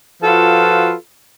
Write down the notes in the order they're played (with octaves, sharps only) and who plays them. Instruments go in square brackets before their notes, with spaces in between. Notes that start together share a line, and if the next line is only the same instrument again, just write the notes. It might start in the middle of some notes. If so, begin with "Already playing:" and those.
[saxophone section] F3 F4 F#4 A4 B4